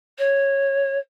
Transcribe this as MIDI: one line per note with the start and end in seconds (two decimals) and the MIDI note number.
0.18 0.98 73